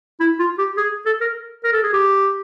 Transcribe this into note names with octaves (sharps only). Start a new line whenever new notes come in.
E4
F4
G4
G#4
A4
A#4
A#4
A4
G#4
G4